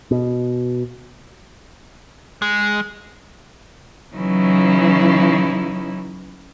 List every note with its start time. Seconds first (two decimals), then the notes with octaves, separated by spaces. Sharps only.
0.11 B2
2.42 G#3
4.16 C#3 E3 F#3 C#4 D#4 E4